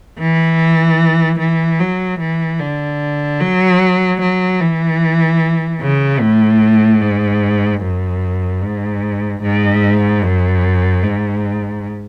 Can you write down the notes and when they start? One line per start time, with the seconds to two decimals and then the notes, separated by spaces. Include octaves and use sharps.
0.19 E3
1.39 E3
1.79 F#3
2.19 E3
2.59 D3
3.40 F#3
4.20 F#3
4.61 E3
5.81 C#3
6.20 A2
7.01 G#2
7.82 F#2
8.62 G#2
9.42 G#2
10.23 F#2
11.03 G#2